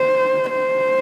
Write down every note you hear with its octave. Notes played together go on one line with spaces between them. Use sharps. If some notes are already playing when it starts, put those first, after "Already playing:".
Already playing: C5
C5